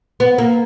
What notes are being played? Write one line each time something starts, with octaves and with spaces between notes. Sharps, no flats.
B3
A#3